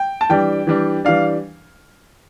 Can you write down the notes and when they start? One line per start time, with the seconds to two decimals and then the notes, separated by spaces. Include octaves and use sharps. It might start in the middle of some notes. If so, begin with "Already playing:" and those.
Already playing: G5
0.21 A5
0.29 E3 G3 D4 G5
0.67 E3 G3 D4
1.05 E3 G3 D4 F5